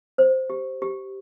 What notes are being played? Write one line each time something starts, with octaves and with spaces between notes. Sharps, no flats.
C5
G4
G4